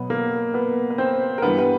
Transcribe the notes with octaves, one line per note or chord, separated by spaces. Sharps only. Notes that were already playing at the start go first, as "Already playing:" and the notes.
Already playing: B2 F#3 B3
A#3 A#4
B3 B4
B4
C4 C5
A#4
G2 E3 G3 B3 B4
B4